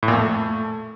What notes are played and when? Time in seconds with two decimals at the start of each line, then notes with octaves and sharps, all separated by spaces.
0.03 A2
0.08 A#2
0.13 F2
0.19 A3